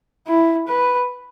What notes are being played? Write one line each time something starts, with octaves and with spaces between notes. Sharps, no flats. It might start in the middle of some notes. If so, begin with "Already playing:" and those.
E4
B4